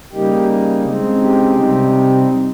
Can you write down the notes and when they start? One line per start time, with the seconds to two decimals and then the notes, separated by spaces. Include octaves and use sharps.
0.13 C#3 G3 A#3 D#4 G4
0.85 C#3 G#3 C4 D#4
1.20 G4
1.56 C3 G3 C4 D#4